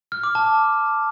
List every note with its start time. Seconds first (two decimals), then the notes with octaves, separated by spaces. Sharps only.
0.12 F6
0.24 D6
0.35 A5